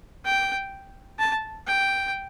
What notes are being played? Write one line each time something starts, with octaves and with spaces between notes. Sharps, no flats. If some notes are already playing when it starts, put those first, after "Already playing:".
G5
A5
G5